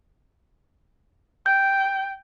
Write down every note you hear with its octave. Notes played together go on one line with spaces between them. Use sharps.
G5 G6